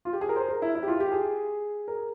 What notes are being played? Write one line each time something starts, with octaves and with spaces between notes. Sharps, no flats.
F4
G4
G#4
A#4
C5
A#4
E4
E4
G4
F4
G4
G#4
A#4